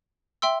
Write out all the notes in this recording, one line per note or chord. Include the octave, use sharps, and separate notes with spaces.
E5 G5 C6 E6